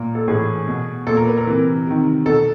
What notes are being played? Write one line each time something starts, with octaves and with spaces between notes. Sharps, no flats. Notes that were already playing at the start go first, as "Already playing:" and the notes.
Already playing: A#2 A#4
A4
A2 E3 G#4
B2
A#2 A4
A#4
B4
A#4
C3 E3
C3 D#3
B2 A4